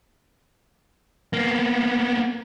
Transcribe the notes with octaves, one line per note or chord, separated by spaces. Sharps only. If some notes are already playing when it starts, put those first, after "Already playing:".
A#3 B3